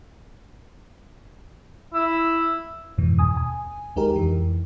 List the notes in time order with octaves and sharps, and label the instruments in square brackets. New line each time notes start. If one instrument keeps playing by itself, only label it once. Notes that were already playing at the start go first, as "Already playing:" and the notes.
[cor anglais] E4
[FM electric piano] F2 G#2 B2 E3
D#2 B2 G#5 D#6
G#5
D#2 G#3 D#4 G4 A#4
F2 E3